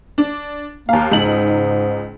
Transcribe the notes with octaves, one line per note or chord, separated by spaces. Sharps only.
D4
D#2 A#3 F5
C#2 G#2 D#4 F#7